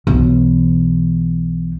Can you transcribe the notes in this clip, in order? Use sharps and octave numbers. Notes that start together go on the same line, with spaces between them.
B1 E3